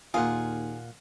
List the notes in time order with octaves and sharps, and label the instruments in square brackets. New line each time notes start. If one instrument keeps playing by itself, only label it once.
[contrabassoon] D#2 [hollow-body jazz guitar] A#2 A#3 F4 [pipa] G#4 [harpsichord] F5 F#5